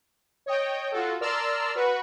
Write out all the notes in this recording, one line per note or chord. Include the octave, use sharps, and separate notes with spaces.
C#5 D#5 G5
F4 F#4 A4
A#4 D5 A5 C6 E6 F6
F#4 B4 C#6